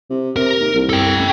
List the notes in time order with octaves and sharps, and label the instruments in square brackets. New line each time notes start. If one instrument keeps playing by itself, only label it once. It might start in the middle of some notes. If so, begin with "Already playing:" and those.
[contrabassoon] C3
[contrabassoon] C3 [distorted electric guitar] A#4
[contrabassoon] D#2
C2
[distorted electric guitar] A4 G5
[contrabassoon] A1